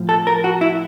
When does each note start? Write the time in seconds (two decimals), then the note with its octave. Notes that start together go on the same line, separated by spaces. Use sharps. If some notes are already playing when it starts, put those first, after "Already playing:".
Already playing: A2 F3
0.09 A4
0.27 A#4
0.44 F#4
0.61 E4